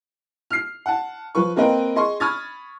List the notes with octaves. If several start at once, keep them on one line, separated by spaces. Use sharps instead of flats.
F6 C7
F#5 A5
F3 B4 C#6
A#3 C4 A#4 B4 D#5 G5
G#4 D#5 C6 C#6
B5 C#6 D#6 F6 G#6 A6